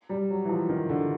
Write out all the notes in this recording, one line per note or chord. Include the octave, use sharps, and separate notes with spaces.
G3
F#3
E3
F3
D#3
D3